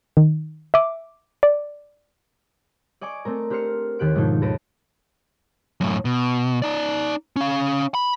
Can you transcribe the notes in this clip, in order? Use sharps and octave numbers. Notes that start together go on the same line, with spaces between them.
D#3
E5 D6
D5
D5 D#5 G#5 C#6 D6
A3 C4 A#4
D4 G4 C5 F6 C7 C#7
D#2 D#3 G4 F#6 D7
G#2 B2 D#3 F3 D4 D#4
D#2 A4 B4 A#6 D7 E7
F#2 A2
B2
D#4 D5
C#4 F5
B5